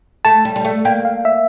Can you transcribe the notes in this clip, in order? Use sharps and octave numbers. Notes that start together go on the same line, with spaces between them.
A3 A5
G3
G3
A3
A#3 G5
F5
E5